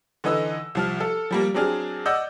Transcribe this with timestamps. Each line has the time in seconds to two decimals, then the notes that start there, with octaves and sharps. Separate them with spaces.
0.24 D3 E3 D#4 B4 D#5 E6
0.75 C2 F3 F6
1.00 A4
1.31 F3 G3 A#3
1.54 F#3 C4 D4 G#4 F6
2.06 D5 D#5 F#5 E6 G6